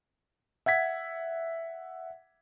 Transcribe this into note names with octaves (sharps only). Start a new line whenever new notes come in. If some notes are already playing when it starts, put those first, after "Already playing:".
E5 F#5 G#6 B6